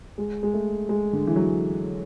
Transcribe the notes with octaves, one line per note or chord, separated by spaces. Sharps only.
G#3
G#3
A3
G#3
D3
E3
F#3